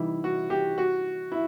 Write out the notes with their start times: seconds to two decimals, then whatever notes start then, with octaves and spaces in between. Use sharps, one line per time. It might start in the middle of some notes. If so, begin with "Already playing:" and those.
Already playing: C3 E3 G3 D#4 E4
0.24 F#4
0.50 G4
0.78 F#4
1.32 E4